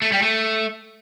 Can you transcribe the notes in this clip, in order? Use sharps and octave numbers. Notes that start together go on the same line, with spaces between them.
A3
G3
A3